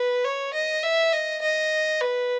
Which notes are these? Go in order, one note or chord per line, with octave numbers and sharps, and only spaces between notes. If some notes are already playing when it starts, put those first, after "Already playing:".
Already playing: B4
C#5
D#5
E5
D#5
D#5
B4